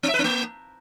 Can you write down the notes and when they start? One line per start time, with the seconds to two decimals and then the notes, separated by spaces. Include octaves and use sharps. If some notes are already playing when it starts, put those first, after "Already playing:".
0.03 C4
0.09 E5
0.14 B4
0.19 C4
0.24 A#3